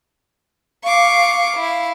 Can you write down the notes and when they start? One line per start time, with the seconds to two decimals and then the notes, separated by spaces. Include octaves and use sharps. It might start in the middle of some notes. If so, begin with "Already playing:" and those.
0.84 F5 C#6 D6
1.56 E4 F5